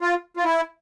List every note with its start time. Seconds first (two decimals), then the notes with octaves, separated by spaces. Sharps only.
0.01 F4
0.37 F4
0.44 E4